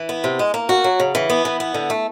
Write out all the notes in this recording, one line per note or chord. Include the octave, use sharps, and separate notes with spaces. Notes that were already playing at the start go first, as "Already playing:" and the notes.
Already playing: E3
B3
C3
G#3
A#3
F#4
F#3
C#3
E3
B3
E3
B3
D3
A3